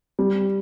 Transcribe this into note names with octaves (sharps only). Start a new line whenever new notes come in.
G3